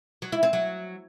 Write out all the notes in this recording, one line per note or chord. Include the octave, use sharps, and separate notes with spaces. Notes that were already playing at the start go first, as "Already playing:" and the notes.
F#3
E4
C4
F#3